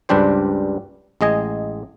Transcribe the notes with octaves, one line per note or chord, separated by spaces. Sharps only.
C#2 G2 G3 D4 G4 C5
A1 G#3 D#5 G#5